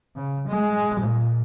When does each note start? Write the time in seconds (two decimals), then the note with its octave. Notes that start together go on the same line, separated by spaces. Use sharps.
0.16 C#3
0.48 G#3
1.00 A#2